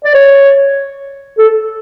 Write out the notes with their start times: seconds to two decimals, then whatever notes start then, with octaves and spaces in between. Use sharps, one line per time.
0.04 D5
0.14 C#5
1.38 A4